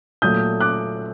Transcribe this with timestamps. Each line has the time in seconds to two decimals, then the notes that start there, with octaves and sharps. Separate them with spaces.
0.22 A#2 F#3 A3 D#6 G6
0.60 D6 F#6